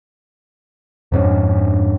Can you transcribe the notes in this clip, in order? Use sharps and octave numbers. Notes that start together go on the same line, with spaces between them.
F2 G#2 C#4